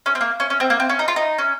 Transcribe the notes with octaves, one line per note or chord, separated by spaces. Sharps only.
C#4
C4
A#3
C#4
C#4
C4
A#3
C4
C#4
D#4
F4
D#4
C#4